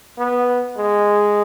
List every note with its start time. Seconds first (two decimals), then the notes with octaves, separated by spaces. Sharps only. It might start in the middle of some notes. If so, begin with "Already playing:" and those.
0.18 B3
0.78 G#3